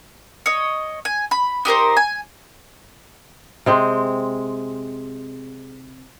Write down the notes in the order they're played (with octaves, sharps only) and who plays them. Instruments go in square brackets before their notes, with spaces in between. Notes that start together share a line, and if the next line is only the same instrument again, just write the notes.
[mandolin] C#5 D#5
G#5
B5
D#4 G4 A#4 C5
G#5
[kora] C3 G#3 C4